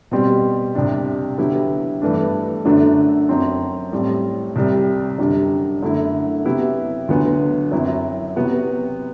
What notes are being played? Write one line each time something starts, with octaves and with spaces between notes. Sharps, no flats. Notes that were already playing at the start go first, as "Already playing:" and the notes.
B2 G3 C4 G4
C2 C3 G3 D4
D3 F#3 B3 E4 G4
G2 E3 A3 D4
F#2 D3 F#3 A3 D4
F#2 F#3 C4
A2 G3 C4
C2 C3 G3
F#2 D3 G3 D4
F#2 D3 A3 E4
C3 F#3 B3 E4 G4
D2 D3 F#3 B3
F#2 F#3 C4 E4
C3 F#3 B3 F#4